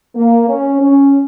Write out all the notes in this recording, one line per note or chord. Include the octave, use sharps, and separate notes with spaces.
A#3
C#4
C#4